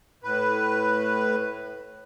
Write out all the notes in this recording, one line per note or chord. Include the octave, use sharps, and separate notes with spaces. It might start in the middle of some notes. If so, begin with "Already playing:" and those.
A2 B4